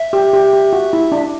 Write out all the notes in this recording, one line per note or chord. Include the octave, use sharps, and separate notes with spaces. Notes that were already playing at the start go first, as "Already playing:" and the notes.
Already playing: E5
G4
G4
G4
F#4
E4
D4